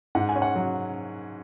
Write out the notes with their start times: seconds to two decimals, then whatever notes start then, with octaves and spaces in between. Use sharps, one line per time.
0.15 G#2 F#5
0.29 G#5
0.35 C#4
0.42 F#5
0.55 F#3